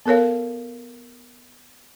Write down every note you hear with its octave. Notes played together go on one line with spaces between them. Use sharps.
B3 A4 A#4 C#5 F5